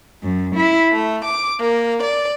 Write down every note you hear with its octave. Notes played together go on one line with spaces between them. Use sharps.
F#2
E4
A3
D6
A#3
D5